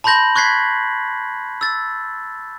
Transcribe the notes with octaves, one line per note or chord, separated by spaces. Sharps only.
A5 B5 C6 G6 A#6 F#7
C#6 F#6 G#6 B6 C7
E6 A6